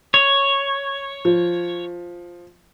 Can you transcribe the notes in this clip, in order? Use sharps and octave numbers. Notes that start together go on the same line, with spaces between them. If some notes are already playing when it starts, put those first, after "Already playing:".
C#5
F3